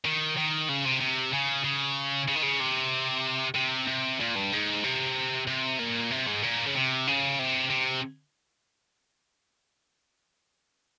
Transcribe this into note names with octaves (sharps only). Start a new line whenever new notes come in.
D#3
D#3
C#3
C3
C3
C#3
C#3
C#3
D#3
C#3
C3
C3
C3
A#2
G2
G#2
C3
C3
A#2
C3
G#2
A#2
C#3
C3
C#3
C3
C3